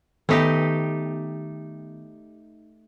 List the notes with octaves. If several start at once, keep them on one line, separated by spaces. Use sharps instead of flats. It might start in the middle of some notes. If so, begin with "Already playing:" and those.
D#3 A3 B3 D#4 G4 B6